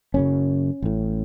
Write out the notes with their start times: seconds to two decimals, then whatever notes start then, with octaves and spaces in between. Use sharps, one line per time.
0.14 F#1 F#2 C#3 C#4
0.82 A1 A2